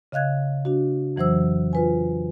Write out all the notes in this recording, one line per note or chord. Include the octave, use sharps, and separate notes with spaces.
C#3 D#5 F5 F#6 G#6
D4 F#4
F2 E3 F#3 C5 E6
F4 B4 G#5